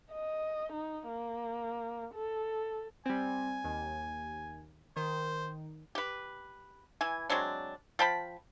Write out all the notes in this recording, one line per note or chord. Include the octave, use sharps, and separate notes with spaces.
D#5
D#4
A#3
A4
G3 C4 G#5
D#2
D#3 C5
G4 B4
E3 G#5
F#3 G#3 C4 D4
F3 G5 A5 B5